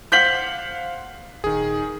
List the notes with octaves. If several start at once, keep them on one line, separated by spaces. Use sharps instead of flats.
C5 F5 F#5 G6 B6 F#7
D#1 D#3 G#4